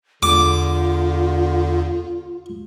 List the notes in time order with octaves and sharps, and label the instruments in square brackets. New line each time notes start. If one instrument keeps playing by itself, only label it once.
[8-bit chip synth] E2 [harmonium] D3 [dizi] F4 [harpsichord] D6